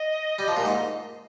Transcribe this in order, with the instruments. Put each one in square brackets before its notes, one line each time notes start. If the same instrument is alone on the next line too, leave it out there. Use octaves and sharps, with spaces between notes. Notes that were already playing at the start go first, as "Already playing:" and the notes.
Already playing: [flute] D#5
[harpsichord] G3
F3
A#2
G#2